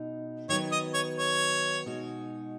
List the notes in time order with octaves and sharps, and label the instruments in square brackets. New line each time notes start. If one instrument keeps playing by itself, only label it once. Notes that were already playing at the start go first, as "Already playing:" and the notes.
Already playing: [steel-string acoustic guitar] B2 D#4
[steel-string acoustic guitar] D#3 F#3 B3 [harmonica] C#5
[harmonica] D#5
C#5
C#5
[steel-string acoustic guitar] B2 G#3 D#4 F#4